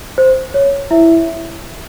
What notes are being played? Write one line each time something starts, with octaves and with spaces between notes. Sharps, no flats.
C5
C#5
E4 E5